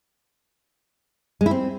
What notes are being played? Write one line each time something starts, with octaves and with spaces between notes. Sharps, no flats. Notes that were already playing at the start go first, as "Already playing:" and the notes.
G#3
E4
C4